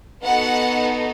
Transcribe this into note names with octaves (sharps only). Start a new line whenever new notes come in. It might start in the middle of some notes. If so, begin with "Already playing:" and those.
B3 D#4 F#4 A4 F#5